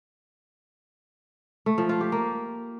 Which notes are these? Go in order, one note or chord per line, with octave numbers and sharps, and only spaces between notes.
A3
F3
F4
G4
A#3